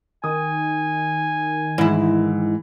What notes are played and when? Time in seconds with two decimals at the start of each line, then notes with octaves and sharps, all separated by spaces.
0.24 D#3 G#5 D#6
1.78 G#2 E3 E4